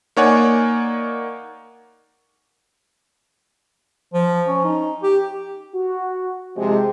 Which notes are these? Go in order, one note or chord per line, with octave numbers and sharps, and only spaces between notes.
A#3 D#4 C#5 D5 F#5 G#5
F3
C#4
D#4
G4
F#4
C3 F3 G#3 G4